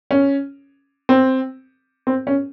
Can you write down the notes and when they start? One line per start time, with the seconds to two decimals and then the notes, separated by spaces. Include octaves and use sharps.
0.11 C#4
1.09 C4
2.07 C4
2.27 C#4